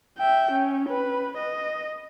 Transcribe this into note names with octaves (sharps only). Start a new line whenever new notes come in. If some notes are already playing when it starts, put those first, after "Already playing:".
E5 G5
C#4
B4
D#5